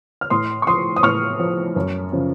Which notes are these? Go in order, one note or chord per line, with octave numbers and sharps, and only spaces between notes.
F6
A2 C6 D#6
C#6
F3 C6 D#6
D#6
A2 C#6 F6
F3
F#2
C#3 F3